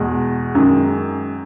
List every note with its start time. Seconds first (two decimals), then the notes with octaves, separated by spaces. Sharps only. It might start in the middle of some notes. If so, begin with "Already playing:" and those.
Already playing: E2 B2 G#3
0.55 F#2 D#3 G#3